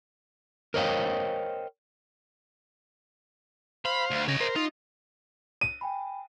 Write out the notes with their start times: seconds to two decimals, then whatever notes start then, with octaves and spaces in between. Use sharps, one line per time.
0.74 A#4 C5 C#5 D#5 F5 G5
3.85 C5 F5 B5
4.11 D2
4.28 C#3 C#5 D#5
4.40 A#4 C5
4.56 D#4 F4
5.61 D#7
5.81 G5 G#5 B5